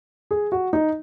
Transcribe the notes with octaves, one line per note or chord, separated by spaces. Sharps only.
G#4
F#4
D#4